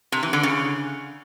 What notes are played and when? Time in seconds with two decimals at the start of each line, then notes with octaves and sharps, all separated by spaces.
0.12 C3
0.23 E3
0.33 D3
0.43 C#3